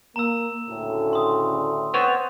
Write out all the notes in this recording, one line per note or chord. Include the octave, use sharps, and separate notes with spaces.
A#3 A#5 E6
D2 A2 C#3
C6 D#6
B3 C4 C#5